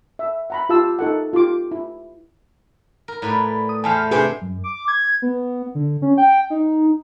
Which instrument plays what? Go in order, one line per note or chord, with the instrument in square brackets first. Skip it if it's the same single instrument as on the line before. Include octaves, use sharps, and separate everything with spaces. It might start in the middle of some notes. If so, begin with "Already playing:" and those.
[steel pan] E5
F#5 A#5 B5
F4 G4 F5 A5 E6
D#4 A4 F#5
F4 G4 D6
E4
[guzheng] A#4
A2 B4 D5
[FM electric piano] D#6
[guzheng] E2 A3 C5 [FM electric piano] G#5 A5 F6
[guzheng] C3 D4 C5 [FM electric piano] G#4 B4 G#5
[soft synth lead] F#2
D6
G#6
B3
D3
C#4
G5
D#4